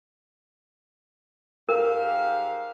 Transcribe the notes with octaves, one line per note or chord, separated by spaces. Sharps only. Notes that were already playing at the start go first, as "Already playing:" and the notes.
G#2 G4 A#4 F5